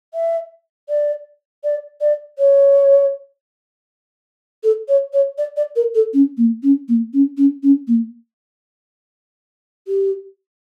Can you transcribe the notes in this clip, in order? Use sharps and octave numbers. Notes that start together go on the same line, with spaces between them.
E5
D5
D5
D5
C#5
A4
C#5
C#5
D5
D5
A#4
A4
C#4
A#3
C#4
A#3
C#4
C#4
C#4
A#3
G4